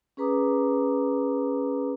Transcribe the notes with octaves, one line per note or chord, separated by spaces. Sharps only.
C#4 G#4 B4 A#5 D6 D#6